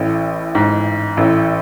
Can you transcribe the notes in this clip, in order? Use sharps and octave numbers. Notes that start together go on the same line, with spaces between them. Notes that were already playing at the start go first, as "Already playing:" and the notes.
Already playing: A1 A2
G#2
A1 A2